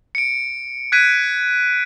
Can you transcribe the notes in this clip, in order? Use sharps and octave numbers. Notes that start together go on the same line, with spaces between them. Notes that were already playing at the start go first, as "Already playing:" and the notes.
C#7 D7
F#6 G#6 B6 D7 D#7